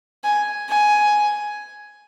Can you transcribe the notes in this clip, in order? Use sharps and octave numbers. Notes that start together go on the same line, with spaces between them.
G#5
G#5